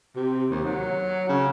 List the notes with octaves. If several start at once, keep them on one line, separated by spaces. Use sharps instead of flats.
C3
D#2
F#3
C#3